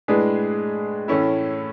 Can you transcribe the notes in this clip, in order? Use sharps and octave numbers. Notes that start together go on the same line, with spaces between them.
A2 G#3 D4 G#4 B4
A2 E3 A3 C#4 E4